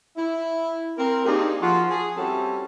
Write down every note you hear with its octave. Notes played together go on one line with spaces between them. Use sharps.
E4
C4 A#4
A#3 C4 D4 D#4 G4 G#4
F3 F4 F#4
G#4
G3 C4 C#4 E4 F#4 A4